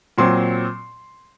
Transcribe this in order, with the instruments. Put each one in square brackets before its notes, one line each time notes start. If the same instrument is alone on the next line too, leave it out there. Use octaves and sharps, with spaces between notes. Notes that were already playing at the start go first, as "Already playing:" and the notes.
[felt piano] A#2 F#3 C4 C6